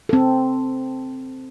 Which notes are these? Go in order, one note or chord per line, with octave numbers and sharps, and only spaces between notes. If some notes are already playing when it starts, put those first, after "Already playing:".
C4 A4